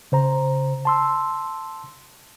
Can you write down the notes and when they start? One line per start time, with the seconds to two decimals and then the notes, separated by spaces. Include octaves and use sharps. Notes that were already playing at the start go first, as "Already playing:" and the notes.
0.12 C#3 C5 A#5
0.85 A5 C6 E6